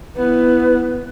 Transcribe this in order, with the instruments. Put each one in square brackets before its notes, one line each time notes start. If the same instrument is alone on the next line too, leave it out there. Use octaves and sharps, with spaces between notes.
[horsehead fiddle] B3 E4 [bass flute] B4